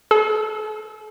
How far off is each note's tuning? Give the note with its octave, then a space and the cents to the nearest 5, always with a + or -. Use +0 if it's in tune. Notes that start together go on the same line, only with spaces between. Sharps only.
A4 -40